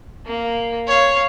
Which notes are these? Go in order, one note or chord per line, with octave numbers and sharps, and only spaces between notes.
A#3
C#5 F5